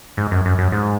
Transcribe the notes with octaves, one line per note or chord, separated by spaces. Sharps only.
G#2
F#2
F#2
F#2
G#2